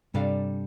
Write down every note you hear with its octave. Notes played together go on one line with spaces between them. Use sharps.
G2 C3 G3 D4 A4 F5